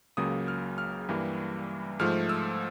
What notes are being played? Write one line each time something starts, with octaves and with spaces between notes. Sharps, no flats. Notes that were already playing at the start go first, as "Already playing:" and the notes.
C#2 C#3 F#3 A#3 D#6
F6
F6
G2 E3 G3 A#3
G#2 F3 A3 F6
E6